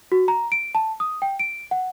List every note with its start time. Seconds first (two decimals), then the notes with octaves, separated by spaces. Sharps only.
0.12 F#4
0.28 A#5
0.52 D7
0.75 A5
1.00 D#6
1.22 G5
1.39 D7
1.71 F#5